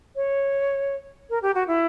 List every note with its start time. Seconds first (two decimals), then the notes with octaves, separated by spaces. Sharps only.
0.16 C#5
1.30 A#4
1.42 G4
1.55 F#4
1.68 E4